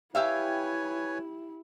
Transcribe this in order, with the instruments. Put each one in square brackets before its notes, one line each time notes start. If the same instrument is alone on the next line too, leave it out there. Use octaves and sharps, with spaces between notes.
[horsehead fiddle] E4 [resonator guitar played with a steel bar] G4 E5 F5 [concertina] B4 C#5 G#5